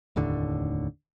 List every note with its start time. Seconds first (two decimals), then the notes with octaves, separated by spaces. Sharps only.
0.16 F1 D#2 A2 D3